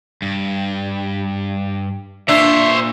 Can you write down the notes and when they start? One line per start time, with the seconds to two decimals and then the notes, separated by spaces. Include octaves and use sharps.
0.22 G2
2.29 A#2 D4 C5 C#5 E5